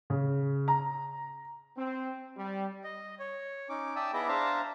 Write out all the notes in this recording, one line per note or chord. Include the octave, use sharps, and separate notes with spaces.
C#3
A#5
C4
G3
D#5
C#5
C#4 D#4 D6
D5 E5 G5 A5 D#6 E6
B3 E4 G#4 D#5 E5 D6
D4 C5 E5 F5 A5 A#5